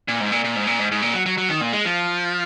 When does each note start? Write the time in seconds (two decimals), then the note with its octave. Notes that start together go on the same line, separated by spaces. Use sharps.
0.08 A#2
0.20 G#2
0.32 A#2
0.44 A#2
0.56 G#2
0.67 A#2
0.79 G#2
0.91 G#2
1.02 A#2
1.14 F#3
1.26 F#3
1.38 F#3
1.49 D#3
1.61 A#2
1.73 G#3
1.85 F3